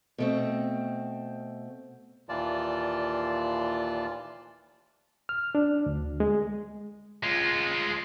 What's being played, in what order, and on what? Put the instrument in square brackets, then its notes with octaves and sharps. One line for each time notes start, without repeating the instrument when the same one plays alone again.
[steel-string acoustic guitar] B2 A3 C4
[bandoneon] D#2 A#2 E3 F4 D5 A5
[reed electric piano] F6
D4
D2
G#3
[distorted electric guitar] G#3 F4